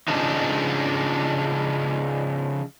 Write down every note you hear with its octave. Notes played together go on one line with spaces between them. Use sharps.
C#3 F3 D4 D#4